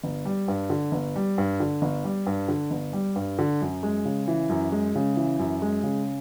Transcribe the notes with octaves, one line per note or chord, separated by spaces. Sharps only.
G1
G3
G2
D3
G1
G3
G2
D3
G1
G3
G2
D3
G1
G3
G2
D3
F#2
G#3
C#3
E3
F#2
G#3
C#3
E3
F#2
G#3
C#3